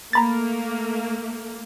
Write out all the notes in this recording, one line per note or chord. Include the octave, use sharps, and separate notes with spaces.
A3 A#3 A#5 B5 A6